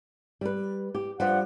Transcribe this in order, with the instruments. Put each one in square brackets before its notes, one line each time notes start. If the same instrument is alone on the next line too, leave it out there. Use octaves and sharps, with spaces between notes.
[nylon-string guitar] G3 B4
G4
[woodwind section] G2 F3 F#5 [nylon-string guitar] G3